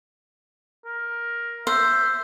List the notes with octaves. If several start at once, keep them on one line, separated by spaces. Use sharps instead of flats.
A#4
C5 E5